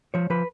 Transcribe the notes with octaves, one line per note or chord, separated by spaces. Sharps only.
F3 C#5
F3 B4